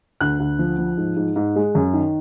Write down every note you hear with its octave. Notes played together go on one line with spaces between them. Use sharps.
D2 F#6
D2
F3
F3
G#2
G#2
G#2
G#3
F#2
D#3